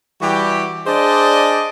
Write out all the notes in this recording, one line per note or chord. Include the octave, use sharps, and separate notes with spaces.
E3 G3 F#4 G4
D4 G#4 C5 D5 D#5